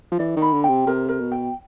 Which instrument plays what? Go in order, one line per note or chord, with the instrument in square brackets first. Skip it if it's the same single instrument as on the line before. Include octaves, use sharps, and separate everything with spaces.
[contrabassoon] F3
[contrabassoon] E3 [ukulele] D5
[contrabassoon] D#3
[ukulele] B5
[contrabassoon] D3
[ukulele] G5
[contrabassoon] C3
[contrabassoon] C3 [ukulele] A#4
[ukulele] A#4
[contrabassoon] B2
[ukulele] G5